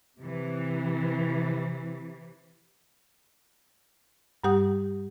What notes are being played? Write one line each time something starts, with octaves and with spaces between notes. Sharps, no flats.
C3 E3
G2 G3 G4 F#5 D#6